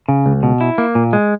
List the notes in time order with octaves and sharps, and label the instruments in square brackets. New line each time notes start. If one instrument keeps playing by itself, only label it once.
[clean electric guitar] C#3
C#2
B2
E4
A#3
A#2
G#3